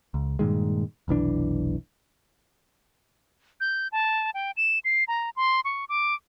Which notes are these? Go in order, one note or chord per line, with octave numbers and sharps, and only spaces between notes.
C#2
G2 A#2 D#3 G#3
F1 B1 E3 D4
G6
A5
G5
E7
C7
A#5
C6
C#6
D6